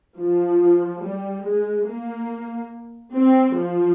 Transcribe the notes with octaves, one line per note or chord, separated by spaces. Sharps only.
F3
G3
G#3
A#3
C4
F3